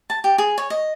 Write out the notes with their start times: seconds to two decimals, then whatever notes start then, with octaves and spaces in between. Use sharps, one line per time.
0.10 A5
0.24 G4
0.38 G#4
0.58 C#5
0.70 D#5